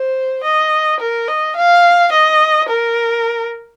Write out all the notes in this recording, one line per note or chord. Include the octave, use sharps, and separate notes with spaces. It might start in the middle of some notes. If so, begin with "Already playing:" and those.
Already playing: C5
D#5
A#4
D#5
F5
D#5
A#4